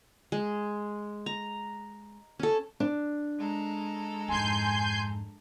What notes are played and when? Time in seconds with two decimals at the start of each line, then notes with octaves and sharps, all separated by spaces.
0.32 G#3
1.26 A#5
2.39 C#4 A4
2.80 D4
3.37 G#3 A4 A#5
4.28 F2 G#2 G#5 C6 G6